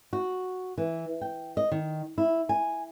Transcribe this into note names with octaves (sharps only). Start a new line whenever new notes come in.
F#4
E3
G5
D#5
D#3
E4
G#5